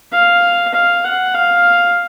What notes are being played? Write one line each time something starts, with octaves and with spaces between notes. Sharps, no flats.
F5
F5
F#5
F5